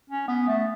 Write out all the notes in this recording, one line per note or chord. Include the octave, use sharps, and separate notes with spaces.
C#4
B3
A3